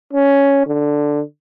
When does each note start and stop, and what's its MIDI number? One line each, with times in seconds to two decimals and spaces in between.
0.13 0.63 61
0.67 1.22 50